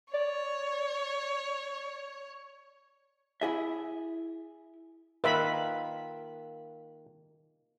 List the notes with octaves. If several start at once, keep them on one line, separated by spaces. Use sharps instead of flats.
C#5 D5
E4 G#4 E5
D#3 A#3 F4 B4 E5 B5